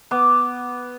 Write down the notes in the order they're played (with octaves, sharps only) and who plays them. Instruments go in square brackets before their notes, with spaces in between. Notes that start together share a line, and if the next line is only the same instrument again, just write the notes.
[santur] B3 D6